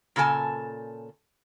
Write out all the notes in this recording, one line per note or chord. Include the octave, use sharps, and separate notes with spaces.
A#2 C#3 A4 A#4 G#5 A5